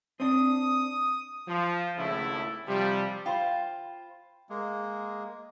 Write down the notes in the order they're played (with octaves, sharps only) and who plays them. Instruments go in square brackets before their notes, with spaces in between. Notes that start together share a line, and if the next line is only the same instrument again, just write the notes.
[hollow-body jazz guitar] C4 D4 [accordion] D#6
[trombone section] F3
G#1 C#2 C#3 A3 E4
C3 F3 G3
[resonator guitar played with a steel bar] F4 C5 [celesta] G5 B5
[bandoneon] G#3 A#3